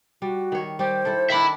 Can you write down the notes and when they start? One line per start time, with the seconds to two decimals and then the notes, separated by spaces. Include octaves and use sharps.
0.22 G3 F#4
0.52 D#3 C#5
0.79 G3 G4 C5
1.05 E4 A4
1.30 D#3 D4 E5 B5